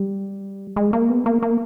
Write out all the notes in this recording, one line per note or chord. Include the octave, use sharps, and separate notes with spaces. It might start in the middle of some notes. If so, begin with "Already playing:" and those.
Already playing: G3
G#3
A#3
B3
A#3
A#3